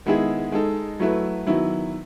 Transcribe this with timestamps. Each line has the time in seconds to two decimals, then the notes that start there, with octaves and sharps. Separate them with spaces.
0.06 D#3 G#3 B3 E4 G#4
0.52 G#3 D#4 A4
1.00 F#3 A3 E4 B4
1.46 D#3 F#3 B3 E4